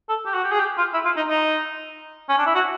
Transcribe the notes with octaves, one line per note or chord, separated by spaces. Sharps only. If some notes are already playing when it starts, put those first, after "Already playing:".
A4
G4
F#4
G4
G#4
G4
F4
E4
F4
D#4
D#4
C#4
D4
E4
F#4